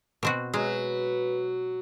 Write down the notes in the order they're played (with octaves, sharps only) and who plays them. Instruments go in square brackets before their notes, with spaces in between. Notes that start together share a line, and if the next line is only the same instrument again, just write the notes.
[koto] B2 C4 F#4
[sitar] F#3 [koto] G#3 [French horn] B4